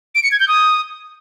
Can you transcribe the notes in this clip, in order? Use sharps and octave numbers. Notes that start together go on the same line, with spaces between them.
D7
C#7
G#6
G6
D#6